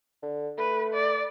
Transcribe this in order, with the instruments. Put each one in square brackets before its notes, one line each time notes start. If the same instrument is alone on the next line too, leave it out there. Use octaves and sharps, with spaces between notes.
[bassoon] D3
[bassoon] A3 [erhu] B4
[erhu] D5